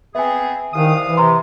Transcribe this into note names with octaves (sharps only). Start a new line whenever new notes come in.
B3 C4 G#4 E5 G#5
C2 D#3 F5 D#6
E3
C3 A#5 C6